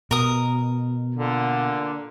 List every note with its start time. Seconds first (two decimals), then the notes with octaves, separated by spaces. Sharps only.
0.11 B2 A#4 D#6
1.15 A#2 D3